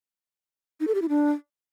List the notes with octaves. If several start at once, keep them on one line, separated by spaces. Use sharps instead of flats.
D#4
A4
G4
E4
D4